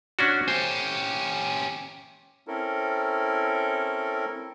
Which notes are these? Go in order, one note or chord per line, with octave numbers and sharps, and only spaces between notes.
C#4 D4 F#4
C#4 G4 C5
C4 C#4 E4 A4 A#4